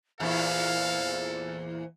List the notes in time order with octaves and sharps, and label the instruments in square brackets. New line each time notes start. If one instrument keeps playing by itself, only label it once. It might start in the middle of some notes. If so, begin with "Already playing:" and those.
[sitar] E2 A#2 E4 [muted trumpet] A4 [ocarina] C5 [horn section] F5